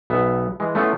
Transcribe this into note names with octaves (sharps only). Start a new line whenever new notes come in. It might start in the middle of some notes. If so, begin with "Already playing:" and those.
B1 B3 E5
E3 G#3
A3 B3 C#4 E4 F4